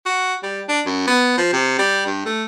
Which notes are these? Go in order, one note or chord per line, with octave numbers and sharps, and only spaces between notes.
F#4
G3
D4
F#2
B3
F3
C3
G3
G2
A3